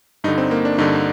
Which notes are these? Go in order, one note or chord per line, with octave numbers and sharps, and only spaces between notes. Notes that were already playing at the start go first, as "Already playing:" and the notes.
G2 D3 D#4
C4
A#3
D4
G2 D3 D#4